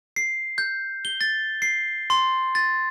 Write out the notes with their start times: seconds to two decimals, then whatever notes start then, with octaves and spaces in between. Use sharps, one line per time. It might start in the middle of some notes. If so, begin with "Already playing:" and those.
0.16 C7
0.58 G6
1.05 G7
1.21 A6
1.62 C7
2.10 C6
2.55 A6